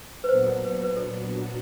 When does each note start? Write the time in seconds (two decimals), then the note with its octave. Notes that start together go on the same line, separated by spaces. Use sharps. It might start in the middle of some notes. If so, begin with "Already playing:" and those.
0.24 B4
0.29 A#2 F#3 B3 D4 F#4 C5
0.47 A#4
0.65 B4
0.83 B4
0.97 A4